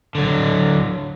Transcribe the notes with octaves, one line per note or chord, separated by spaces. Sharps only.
D3 F#3